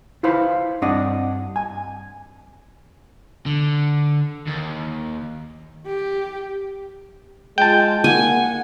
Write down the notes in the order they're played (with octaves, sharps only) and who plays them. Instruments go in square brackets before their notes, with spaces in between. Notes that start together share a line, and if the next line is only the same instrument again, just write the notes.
[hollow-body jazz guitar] E4 F4 B4 C5 F5 B5
G2 C4 D4 D5 D#5 F#5
G#5
[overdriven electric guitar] D3
D#2
[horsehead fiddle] G4
[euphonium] G#3 [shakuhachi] F4 [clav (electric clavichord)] G5 A5
[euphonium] A#3 [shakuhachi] F#5 [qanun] G#5